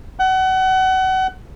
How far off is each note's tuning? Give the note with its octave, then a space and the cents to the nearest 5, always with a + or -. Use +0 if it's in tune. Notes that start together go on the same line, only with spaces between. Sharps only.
F#5 +30